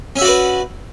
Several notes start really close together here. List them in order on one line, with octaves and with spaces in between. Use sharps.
C#4 E5 F#4 D5 B4